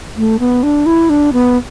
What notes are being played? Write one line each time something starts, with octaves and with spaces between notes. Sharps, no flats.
A3
B3
D4
E4
D4
B3